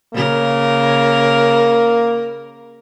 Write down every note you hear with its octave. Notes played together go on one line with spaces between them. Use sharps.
C#3 A#3 A#4